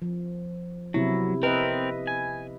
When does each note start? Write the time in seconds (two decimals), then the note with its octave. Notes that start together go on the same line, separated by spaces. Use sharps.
0.02 F3
0.94 C3 F#3 B3 E4
1.43 C4 A#4 B4 D#5 E5
2.07 G#5